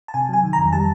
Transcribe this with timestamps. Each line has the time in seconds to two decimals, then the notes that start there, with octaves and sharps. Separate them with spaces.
0.08 A5
0.14 C3 G#5
0.29 F#3 G#5
0.43 D#3
0.53 A#5
0.59 F2
0.73 G3 A5